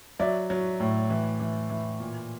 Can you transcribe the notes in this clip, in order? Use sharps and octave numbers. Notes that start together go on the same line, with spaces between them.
F#3 D5 E5
F#3
A2
E3
E3
E3
A#2